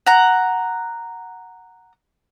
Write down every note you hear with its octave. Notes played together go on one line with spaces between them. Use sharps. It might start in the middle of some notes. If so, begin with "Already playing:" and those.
F#5 A#5